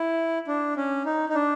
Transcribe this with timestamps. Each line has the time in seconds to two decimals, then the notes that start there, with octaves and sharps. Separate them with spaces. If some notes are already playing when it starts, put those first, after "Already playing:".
Already playing: E4
0.47 D4
0.77 C#4
1.06 D#4
1.29 D#4
1.35 D4